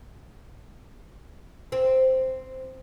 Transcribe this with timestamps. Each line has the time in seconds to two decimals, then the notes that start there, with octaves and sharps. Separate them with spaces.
1.72 C4